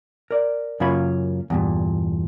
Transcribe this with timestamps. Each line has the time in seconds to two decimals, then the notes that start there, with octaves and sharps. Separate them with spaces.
0.31 A#4 D5
0.80 F#2 C#3 A#3 F4 C#5 B5
1.50 E2 G2 A#2